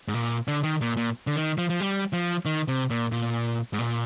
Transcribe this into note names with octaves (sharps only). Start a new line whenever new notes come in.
G#2
A#2
D3
D#3
A#2
A#2
D3
D#3
F3
F3
G3
F3
D#3
C3
A#2
A#2
G#2
A#2